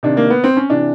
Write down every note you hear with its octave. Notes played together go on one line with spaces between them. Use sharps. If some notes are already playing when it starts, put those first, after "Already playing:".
C3 D#3 D4
A#3
B3
C4
C#4
C3 E3 D4